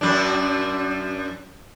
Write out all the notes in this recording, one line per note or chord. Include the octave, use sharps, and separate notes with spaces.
F#2 D4